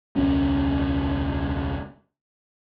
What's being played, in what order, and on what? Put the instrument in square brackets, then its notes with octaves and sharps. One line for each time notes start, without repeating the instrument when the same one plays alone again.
[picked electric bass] E1 C#2 F#3 C#4